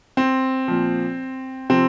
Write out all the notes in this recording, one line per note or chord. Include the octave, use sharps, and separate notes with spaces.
C4
A#2 F3
C3 F3 C4